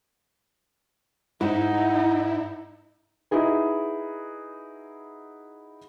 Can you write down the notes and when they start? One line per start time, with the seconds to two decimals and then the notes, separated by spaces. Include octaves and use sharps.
1.41 G#2 D#4 E4 F#5
3.31 D#4 E4 F#4 G#4 B4